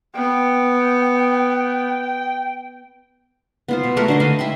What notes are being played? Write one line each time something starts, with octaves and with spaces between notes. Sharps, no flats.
B3 G5
B3 F4 C5
B2
A3 F#4 A#4 B4
D3 C5 D#5
D#5 F5 G#5 B5
E5 G5 C6